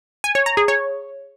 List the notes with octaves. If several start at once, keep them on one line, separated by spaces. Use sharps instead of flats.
G#5
C#5
A#5
G#4
C#5